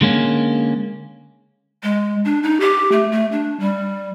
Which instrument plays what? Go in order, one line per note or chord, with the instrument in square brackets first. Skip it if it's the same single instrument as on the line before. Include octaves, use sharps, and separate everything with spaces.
[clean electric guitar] D3 G#3 A#3 C#4
[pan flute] G#3
D4
D#4
G4
A3
A3
D4
G3